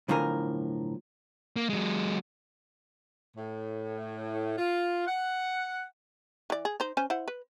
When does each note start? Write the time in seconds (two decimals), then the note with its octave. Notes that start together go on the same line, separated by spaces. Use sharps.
0.08 B1 A2 D3 F3 A#4 G#5
1.56 A#3
1.70 F#3 G#3
3.37 A2
4.58 F4
5.07 F#5
6.50 E3 D5
6.65 G#4
6.80 D#4 C5
6.97 C#4 C5 G#5
7.10 E4 C5 F#5
7.28 B4